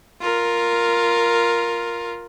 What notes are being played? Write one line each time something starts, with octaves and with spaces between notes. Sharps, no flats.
F4 A#4